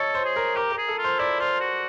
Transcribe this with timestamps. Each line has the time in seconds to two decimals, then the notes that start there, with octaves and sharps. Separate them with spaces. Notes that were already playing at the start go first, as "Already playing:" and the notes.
Already playing: A4 C#5 D#5
0.15 C5
0.25 G#4
0.36 A#4
0.57 G4 A#4
0.72 A#4
0.78 G#4
0.88 A4
0.98 F4
1.04 C5
1.19 E4 D5
1.40 F4 C5
1.61 F#4